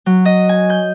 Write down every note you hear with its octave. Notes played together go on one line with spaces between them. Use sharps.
F#3
D#5
G#5
G6